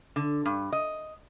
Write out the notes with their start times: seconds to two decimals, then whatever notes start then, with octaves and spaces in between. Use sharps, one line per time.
0.16 D3
0.45 G2
0.72 D#5